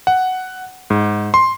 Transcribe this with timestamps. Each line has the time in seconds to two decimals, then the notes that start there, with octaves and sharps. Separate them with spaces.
0.07 F#5
0.90 G#2
1.34 C6